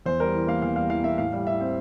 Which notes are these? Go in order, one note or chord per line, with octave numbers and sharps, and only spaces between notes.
E2 C5
G3 A#4
E3
A#3 F5
E2 F5
G3 F5
E3 F5
A#3 E5
A2 F5
G3
E3 E5
C4